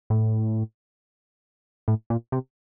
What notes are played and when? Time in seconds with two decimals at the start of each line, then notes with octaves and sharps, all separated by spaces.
0.10 A2
1.88 A2
2.10 A#2
2.32 C3